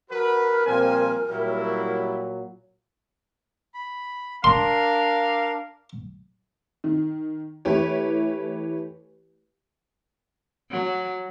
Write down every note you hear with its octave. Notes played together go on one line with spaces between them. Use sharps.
F#3 F#4 A#4 B4
A#2 F3 G3 C4 G#5
A#2 F#3 G3 E4
B5
D4 A#4 F5 C6
D#3
E3 A3 E4 G4 B4 C#5
F#3